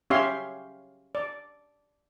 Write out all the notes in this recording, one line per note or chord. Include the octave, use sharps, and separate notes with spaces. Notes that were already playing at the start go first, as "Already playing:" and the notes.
C#4 G4 C#5 E5 F5 C6
D5